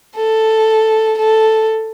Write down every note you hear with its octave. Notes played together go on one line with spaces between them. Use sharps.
A4
A4